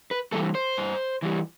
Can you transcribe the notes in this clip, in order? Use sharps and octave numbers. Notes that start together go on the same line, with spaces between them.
B4
E3 G3 A4
C5
G2
E3 G3